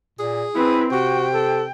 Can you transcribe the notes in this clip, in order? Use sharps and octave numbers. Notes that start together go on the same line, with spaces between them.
A#2 G#4
C4 E4 B4
C3 F#4 G5
A4